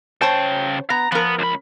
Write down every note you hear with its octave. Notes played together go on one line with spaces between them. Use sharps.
C#3 C5 C#5 G5 A5
B3 A#5
F3 B3 A#4
C#2 B5